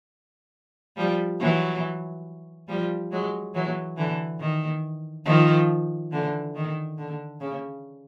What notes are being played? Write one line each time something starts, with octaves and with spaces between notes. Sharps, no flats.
F3 G3
E3 F#3
F3 G3
F#3 G#3
E3 F#3
D3 E3
D#3
D#3 F3
D3 E3
D#3
D3
C#3